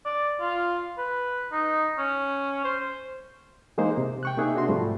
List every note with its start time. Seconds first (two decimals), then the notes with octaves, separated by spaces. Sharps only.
0.05 D5
0.41 F4
0.98 B4
1.52 D#4
1.98 C#4
2.64 C5
3.78 E3 G#3 A#3 D#4 C5
3.98 C3
4.23 G5 C#6 F#6
4.37 C3 A#3 D#4 G#4 E5
4.55 D4 F#4 C6
4.68 G#2 C3 F3 G3 A3